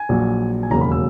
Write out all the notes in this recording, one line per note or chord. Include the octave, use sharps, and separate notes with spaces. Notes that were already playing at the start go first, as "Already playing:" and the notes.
Already playing: G#5
A#1 A#2 F#3
G#5
E1 D#2 C#3 F#3 A#3 A#5
B5
E6